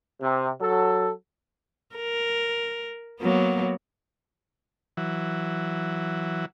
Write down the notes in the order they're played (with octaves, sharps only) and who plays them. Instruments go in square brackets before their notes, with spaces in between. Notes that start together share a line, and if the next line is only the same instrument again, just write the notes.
[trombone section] C3
F#3 A4
[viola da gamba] A#4
F#3 A#3 B3
[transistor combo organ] E3 F#3